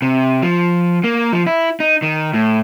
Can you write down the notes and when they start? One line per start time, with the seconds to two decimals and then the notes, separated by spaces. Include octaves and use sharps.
0.02 C3
0.42 F3
1.04 A#3
1.32 F3
1.47 E4
1.80 D#4
2.02 D#3
2.34 A2